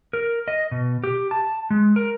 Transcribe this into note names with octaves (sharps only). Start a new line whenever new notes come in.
A#4
D#5
B2
G4
A5
G#3
A#4